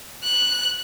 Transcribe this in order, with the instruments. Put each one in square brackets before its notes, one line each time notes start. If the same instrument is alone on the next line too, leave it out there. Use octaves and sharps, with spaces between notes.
[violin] F#6